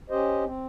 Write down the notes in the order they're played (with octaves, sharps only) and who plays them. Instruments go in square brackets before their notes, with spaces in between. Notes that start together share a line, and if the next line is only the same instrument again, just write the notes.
[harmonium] C#4 G4 C5 D#5
C4